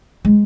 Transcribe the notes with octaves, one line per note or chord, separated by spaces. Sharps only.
G#3